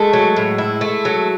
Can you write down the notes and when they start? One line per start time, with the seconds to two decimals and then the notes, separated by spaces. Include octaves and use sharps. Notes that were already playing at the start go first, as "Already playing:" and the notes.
Already playing: G#3 A3
0.13 F#3
0.36 A2
0.58 E4
0.81 A3
1.05 F#3